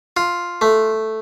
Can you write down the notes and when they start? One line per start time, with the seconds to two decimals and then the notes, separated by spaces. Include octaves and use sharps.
0.17 F4
0.61 A3